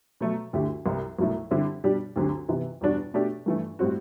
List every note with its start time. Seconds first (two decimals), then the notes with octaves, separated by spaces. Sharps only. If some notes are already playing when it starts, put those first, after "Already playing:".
0.21 B2 F#3 A3
0.53 D2 D3 A3 E4 G4
0.86 C2 C3 G3
1.19 C2 B2 F#3 A3 E4
1.51 D3 G3 C4 E4 G4
1.84 B2 G3 D4 G4
2.16 D2 D3 F#3 C4 G4
2.48 C3 E3 B3
2.81 E2 B2 G3 D4 F#4
3.14 B2 A3 D4 G4
3.46 G2 E3 A3
3.79 A2 G3 C4 F#4